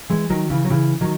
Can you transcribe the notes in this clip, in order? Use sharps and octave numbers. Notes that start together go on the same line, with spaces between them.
E3 G#3
D#3 F#3
C#3 E3
F#3
C#3 E3
D#3 F#3